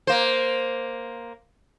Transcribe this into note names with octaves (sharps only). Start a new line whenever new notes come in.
A#3 C5